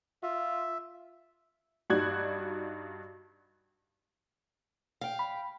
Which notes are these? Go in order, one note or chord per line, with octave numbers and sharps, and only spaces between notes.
F4 E5
G2 D#4 F#4 D5 F#6 G#6
F5 G5
B5